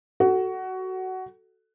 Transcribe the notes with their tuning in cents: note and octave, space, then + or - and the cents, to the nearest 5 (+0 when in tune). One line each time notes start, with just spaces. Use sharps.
F#4 +15 A4 +0